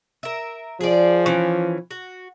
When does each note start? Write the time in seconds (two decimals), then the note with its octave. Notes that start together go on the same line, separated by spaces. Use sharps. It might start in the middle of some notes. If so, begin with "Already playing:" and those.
0.23 A#4 E5
0.80 F3 G#4 D5
1.26 E3 C#4
1.91 F#4